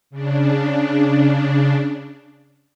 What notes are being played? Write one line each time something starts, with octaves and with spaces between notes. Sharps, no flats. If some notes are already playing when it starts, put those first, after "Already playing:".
C#3 D4